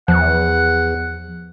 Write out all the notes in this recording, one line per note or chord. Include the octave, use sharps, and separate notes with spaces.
E2 F3 F#5